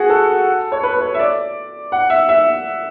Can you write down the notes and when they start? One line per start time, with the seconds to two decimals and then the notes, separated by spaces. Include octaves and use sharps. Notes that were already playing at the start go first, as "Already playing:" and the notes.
Already playing: F#4 G#4
0.10 A4
0.72 C#5
0.83 B4
0.94 B4
1.01 C#5
1.14 E5
1.19 D5
1.92 F#5
2.10 E5
2.29 E5